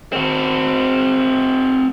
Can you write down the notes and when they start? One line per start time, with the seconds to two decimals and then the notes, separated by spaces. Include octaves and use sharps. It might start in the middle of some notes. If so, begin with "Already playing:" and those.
0.13 C4 F#4